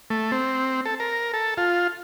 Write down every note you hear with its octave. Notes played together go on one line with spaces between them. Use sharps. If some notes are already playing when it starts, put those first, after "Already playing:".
A3
C4
A4
A#4
A4
F4